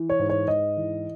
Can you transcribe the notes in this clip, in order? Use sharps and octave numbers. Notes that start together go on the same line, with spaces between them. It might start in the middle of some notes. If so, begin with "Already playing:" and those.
Already playing: E3
C#5
G#2
C#5
G#2 D#5
E3